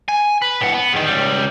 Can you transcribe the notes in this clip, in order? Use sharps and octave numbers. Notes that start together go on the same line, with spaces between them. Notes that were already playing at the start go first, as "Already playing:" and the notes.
G#5
B4
A2 F#5
B3
E2 D#3
C#2 G3